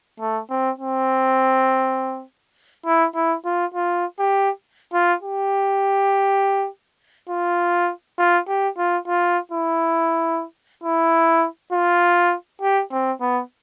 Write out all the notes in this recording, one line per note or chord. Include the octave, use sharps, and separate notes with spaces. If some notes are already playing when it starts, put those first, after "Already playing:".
A3
C4
C4
E4
E4
F4
F4
G4
F4
G4
F4
F4
G4
F4
F4
E4
E4
F4
G4
C4
B3